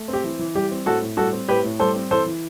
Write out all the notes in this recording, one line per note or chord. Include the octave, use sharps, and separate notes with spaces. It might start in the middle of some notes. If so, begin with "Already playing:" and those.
Already playing: A3
C4
G4
E3
E3
G3 G4
C4
A2 F#4 A4
A2
G3 F#4 A4
C4
A2 G4 B4
A2
G3 A4 C5
C4
E3 A4 C5
E3